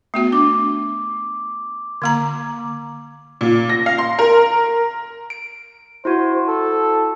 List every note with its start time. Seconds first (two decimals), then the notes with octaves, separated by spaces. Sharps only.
0.14 A3 B3 F#4
0.32 D4 D6
2.02 D3 A#3 A#5
3.41 A#2
3.69 A#6
3.86 F5
3.98 C6
4.19 A#4
5.30 D7
6.05 E4 F#4 C5
6.48 A4